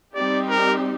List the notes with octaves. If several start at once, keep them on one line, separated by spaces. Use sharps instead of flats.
G3 C4 D#4 G4 D5
A#4